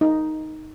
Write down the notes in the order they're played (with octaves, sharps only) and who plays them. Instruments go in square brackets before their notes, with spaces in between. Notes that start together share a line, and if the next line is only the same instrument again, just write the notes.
[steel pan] D#4